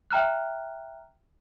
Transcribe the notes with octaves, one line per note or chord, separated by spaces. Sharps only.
E5 G5 A#5 F6 F#6